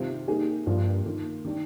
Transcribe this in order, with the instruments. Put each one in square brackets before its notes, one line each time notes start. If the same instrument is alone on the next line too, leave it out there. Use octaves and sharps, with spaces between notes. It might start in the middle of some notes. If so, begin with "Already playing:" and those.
Already playing: [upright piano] C3 D#3 G3 C4 F4
G3 A#3 D#4 G#4
[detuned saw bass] G2 [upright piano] F3 A#3 D4 F4
[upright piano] D#3 A#3 F4
D#3 G3 D4 G4